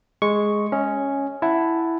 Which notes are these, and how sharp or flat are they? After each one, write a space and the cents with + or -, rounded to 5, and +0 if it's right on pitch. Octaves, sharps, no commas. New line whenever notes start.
G#3 +0 C#6 +0
C#4 +0 D#5 +30
E4 +5 F#5 +0 A5 +0